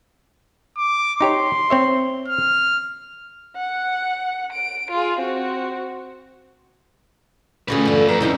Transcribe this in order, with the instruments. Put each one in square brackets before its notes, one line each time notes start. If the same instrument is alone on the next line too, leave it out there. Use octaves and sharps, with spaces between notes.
[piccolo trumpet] D6
[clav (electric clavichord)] D#4 G4 C#5 [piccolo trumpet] C6
[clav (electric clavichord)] C4 C#5 E5
[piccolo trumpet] F6
[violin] F#5
D7
F4 G#4
C4 F#4
[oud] D2 A3 G#4 [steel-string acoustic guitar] C#4 F#4 [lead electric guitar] F4 B4
[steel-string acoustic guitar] E2 G2 [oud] D3 [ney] A4
[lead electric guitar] F2 [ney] B4 [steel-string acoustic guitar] A#5
[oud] D2 G2 D#4 [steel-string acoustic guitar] C#3 A3 [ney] E4